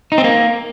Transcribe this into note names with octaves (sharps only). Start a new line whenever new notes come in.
D#4
C4
A#3